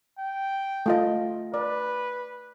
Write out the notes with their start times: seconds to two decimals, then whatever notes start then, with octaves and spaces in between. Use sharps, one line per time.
0.18 G5
0.86 A3 F4 D#5
1.54 B4 D5